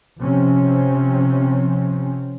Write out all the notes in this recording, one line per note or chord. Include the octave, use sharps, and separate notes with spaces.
C3 F3 C4 C#4